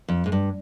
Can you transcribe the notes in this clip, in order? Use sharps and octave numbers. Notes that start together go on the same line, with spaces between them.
F2
G#2
G2